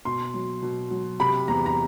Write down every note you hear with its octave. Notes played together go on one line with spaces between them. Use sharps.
B2 C6
F#3
B2
F#3
C3 B5
E2 A#5
A#5